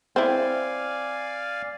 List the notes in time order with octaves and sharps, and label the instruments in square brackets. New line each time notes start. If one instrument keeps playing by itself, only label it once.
[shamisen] C4 E4 [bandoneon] D5 F5 G#5